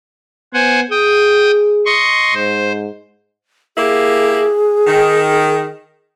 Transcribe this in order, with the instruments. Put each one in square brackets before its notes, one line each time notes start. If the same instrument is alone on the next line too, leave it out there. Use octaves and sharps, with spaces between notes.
[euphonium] B3 [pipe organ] C5 F#5 G#5
[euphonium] G#4 [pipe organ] G5 D#6
[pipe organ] D#5 C6 C#6
[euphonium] G#2 [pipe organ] C5
[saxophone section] A#3 E4 G4 [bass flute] G#4
[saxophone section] D#3